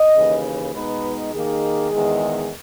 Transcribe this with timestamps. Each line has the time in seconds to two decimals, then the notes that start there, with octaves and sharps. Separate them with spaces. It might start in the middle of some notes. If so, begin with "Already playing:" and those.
Already playing: D#5
0.16 D#2 C#3 E3
0.74 B2 G#3 D#4 B4
1.33 D#2 D#3 A#3 D#4 G#4
1.92 E2 D#3 G#3